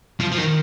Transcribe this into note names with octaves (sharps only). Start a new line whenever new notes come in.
F3
F3
D#3